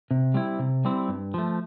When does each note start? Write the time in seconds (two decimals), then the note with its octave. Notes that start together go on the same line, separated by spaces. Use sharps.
0.11 C3
0.34 G3 C4 E4
0.59 C3
0.85 G3 C4 E4
1.08 G2
1.34 F3 A3